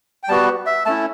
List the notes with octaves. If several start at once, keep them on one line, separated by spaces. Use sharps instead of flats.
G5
G3 B3 F#4 A5
E5
A3 C#4 E4 A5